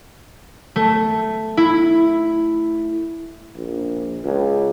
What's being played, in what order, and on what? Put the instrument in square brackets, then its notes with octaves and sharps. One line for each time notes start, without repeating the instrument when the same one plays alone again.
[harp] A3
E4
[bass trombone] A#1
C#2